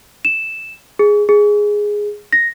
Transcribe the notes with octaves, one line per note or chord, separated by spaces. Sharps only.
E7
G#4
G#4
A#6